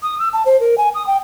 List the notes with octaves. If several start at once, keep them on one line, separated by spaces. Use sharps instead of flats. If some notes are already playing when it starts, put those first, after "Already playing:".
D#6
E6
A5
C5
A#4
G#5
D#6
G5